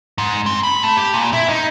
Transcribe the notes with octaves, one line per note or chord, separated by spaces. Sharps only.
G#2
C4
B5
A3
G4
A#2
E4
D#4